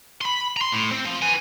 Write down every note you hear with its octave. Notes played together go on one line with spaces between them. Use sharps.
B5 C6
A#5 C6
A2
C4
F3
B4 G#5